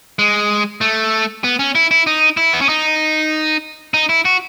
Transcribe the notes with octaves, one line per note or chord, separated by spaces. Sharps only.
G#3
A3
B3
C#4
E4
E4
D#4
E4
B3
C#4
D#4
D#4
E4
F#4